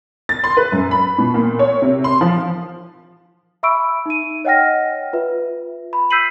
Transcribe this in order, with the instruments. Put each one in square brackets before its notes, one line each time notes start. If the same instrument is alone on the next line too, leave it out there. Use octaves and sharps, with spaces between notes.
[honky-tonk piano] A6
C6
B4
F#2
B5
B2
A#2
C#5
C3
C6
F3
[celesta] E5 B5 C#6 E6 D7
D#4 D#7
C#5 D#5 F#5 G5 F6 A#6
F4 B4 E5
B5
E6 G6 B6 C7 D#7 F#7